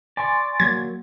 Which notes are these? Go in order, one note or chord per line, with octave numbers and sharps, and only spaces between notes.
D5 G#5 C6 C#6
F#3 A#3 G#6